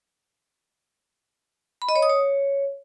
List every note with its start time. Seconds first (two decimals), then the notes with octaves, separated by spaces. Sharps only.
1.82 B5
1.89 D#5
1.96 C#5
2.02 D#6
2.09 C#5